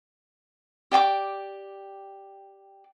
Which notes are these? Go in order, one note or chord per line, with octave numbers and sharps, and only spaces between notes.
G4 D5 G5 D6